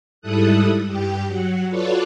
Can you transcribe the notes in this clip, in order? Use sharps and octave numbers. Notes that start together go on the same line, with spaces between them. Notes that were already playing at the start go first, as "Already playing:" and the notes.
G#2 G3 E4 A4 D#6 F#6
G2 G4 G5
F#3 F#5
F4 F#4 A4 B4 C#5 D5